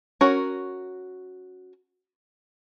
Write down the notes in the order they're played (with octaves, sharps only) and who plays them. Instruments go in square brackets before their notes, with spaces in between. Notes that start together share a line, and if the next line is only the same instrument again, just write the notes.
[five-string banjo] C#4 F#4 A#4 C#5